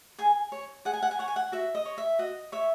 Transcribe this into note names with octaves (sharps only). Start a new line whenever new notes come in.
G#4 G#5
C#5
G#4 F#5
G#5
F#5
G#5
C#5 F#5
G#5
F#5
F#4 E5
D#5
C#5
E5
F#4 D#5
C#5 E5